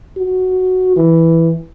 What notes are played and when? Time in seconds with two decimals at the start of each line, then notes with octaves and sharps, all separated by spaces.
0.17 F#4
0.96 E3